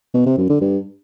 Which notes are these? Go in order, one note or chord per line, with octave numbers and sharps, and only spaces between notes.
B2
C3
F#2
D3
G2